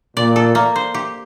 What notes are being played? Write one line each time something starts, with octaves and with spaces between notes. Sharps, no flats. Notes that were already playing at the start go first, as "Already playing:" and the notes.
A#2 D5
A4
A#3
C5
G4